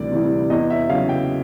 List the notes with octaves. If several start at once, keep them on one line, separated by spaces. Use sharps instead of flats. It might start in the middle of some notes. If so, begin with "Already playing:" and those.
Already playing: D2 C3 E3 G3 D5
C3 E3 G3
E2 D#5
E5
C#3 F#3 F5
G5